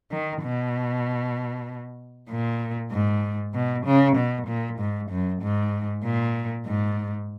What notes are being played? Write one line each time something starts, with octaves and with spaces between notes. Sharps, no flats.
D#3
B2
A#2
G#2
B2
C#3
B2
A#2
G#2
F#2
G#2
A#2
G#2